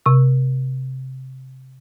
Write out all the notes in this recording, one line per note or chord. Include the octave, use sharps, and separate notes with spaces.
C3 E6